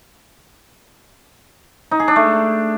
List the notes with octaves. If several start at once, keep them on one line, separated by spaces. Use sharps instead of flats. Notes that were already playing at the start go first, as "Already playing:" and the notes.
D#4
G#4
D4
A3